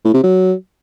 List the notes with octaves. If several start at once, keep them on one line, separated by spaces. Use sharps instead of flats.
A2
C3
F#3